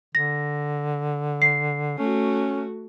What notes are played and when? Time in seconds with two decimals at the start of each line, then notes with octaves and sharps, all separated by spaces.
0.15 D3 A#6
1.42 C7
1.98 A3 C#4 F#4